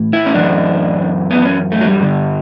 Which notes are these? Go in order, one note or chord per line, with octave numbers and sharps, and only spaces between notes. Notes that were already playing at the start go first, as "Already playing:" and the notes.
Already playing: A2 E3
E4
C#4
F#2 E3 D4
B3
C#4
A3
F#3
G3
G2 D3